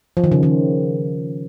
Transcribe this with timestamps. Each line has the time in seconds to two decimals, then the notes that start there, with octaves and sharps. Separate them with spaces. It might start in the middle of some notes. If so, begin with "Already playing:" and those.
0.17 F3
0.24 D#3
0.32 C#3
0.43 D#3